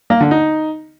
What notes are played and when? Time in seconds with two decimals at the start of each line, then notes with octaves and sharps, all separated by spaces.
0.10 A#3
0.21 D3
0.31 D#4